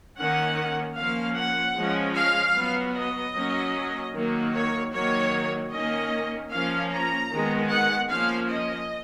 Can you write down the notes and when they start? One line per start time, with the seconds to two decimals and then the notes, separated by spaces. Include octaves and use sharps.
0.17 D#3 A#3 C#4 F#5
0.96 F3 A#3 C#4 F5
1.36 F#5
1.76 F3 G#3 C#4
2.15 F5
2.55 F#3 B3
2.95 D#5
3.34 F#3 A#3 C#4
4.13 D#3 F#3 A#3
4.53 C#5
4.92 D#3 F#3 A#3 C#5
5.71 D#3 A#3 C#4 D#5
6.51 F3 A#3 C#4 F5
6.90 A#5
7.31 D#3 G#3 B3
7.70 F#5
8.09 F3 A#3 C#4 F5
8.48 D#5